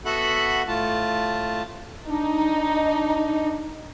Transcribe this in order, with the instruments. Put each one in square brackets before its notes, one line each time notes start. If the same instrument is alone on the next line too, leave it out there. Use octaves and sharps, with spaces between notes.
[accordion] B3 F#4 A4 E5 F#5 B5
A2 A3 F4 A5
[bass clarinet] D4 [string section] D#4